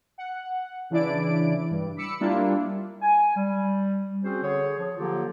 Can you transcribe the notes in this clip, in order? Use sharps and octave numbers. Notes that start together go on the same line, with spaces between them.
F#5
C#3 E3 D4 E4 D5 D7
G2
B5 D6 E6 C#7
G3 A#3 D4 E4 F4
G#5
G3
C4 C#4 F#4 G#4 C5
D3 G#4 C#5
F3
D3 F3 F#3 A#3 F4 G4